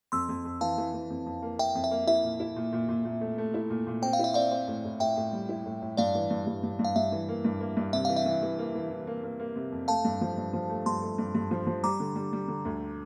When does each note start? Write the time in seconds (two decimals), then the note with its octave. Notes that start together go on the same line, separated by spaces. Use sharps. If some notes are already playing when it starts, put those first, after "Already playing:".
0.12 F2 C6 E6
0.29 F2
0.45 F2
0.61 E3 F5 A5
0.78 E3
0.94 E3
1.10 F2
1.26 F2
1.42 A#3
1.59 A#3 E5 G5
1.75 F2
1.84 E5
1.91 A#3
2.07 E4 E5
2.24 A#2
2.40 E4
2.56 A#2
2.73 A#2
2.89 A#2
3.05 A#2
3.21 A3
3.38 A3
3.54 E4
3.70 A#2
3.87 A#2
4.02 C4 G5
4.13 F5
4.19 E4 E5
4.34 C4 D5 F5
4.51 C4
4.68 A2
4.84 A2
5.00 A2 E5 G5
5.16 A2
5.33 G3
5.49 E4
5.66 A2
5.82 A2
5.97 G2 D5 F5
6.15 E3
6.30 G2
6.47 G2
6.63 G2
6.79 G2
6.84 F5
6.96 G2 E5
7.12 E3
7.29 A#3
7.45 G2
7.61 A#3
7.77 G2
7.93 C3 E5
8.05 E3 F5
8.16 E5
8.26 E3
8.42 E3
8.58 A#3
8.75 E3
8.91 E3
9.07 A#3
9.24 A#3
9.40 A#3
9.56 C3
9.72 F2
9.88 A3 F5 A5
10.05 G2
10.21 F3
10.37 G2
10.53 F3
10.70 A3
10.86 G2 A5 C6
11.02 A3
11.18 G2
11.35 G2
11.51 F3
11.67 F3
11.84 G3 A#5 D6
12.00 D3
12.16 G3
12.33 G3
12.48 D3
12.65 D2